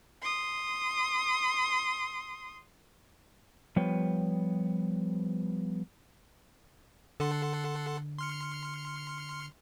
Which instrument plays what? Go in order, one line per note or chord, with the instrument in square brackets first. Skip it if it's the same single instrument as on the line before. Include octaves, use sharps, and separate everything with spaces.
[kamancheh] C6 D#6
[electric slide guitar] F3 G3 B3 B4 C#5 G5
[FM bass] D3 [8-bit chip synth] A4 F#5 C6
[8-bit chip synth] C6 F6 C#7